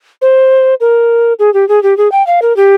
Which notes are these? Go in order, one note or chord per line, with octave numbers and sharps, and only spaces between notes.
C5
A#4
G#4
G4
G#4
G4
G#4
G5
F5
A#4
G4